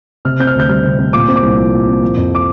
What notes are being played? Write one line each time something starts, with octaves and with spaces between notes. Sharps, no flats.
C3 F6
C4 G6
F6
D2
G6
G3 F6
C3
C4
A#2 D6
C4
D6
C2
F3
A#2
C4
F3
F2
D6